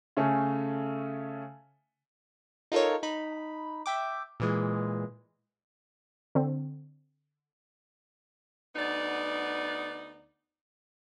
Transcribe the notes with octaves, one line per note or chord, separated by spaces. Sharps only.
C#3 A3 C#4 A4
D#4 F4 A4 A#4 C#5
D#4 B5
E5 G5 D6
A#2 E3 G#3
D3 C4
D2 B3 D#4 D5